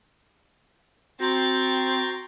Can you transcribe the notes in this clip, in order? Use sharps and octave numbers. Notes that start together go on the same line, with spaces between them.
C4 F#4 G5 A#5 C6 C#6 A6